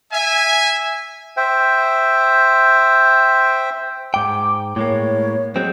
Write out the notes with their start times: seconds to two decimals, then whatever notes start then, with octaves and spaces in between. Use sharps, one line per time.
0.13 E5 G#5
1.37 C5 E5 G5
4.14 G#2 G5 D6
4.76 A2 G#3 A#3 C#5
5.56 F#3 G#3 C4 G6